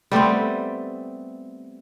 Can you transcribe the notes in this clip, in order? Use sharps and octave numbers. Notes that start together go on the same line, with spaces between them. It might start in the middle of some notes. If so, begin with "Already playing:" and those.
G3 A3 B3 C4